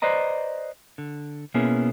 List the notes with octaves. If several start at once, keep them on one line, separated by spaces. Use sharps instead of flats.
B4 C5 D5 D#5 A#5
D3
B2 A#3 B3 C#4 E4 G#4